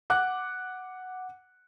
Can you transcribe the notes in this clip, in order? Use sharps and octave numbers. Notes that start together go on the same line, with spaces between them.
F#5 D6 F#6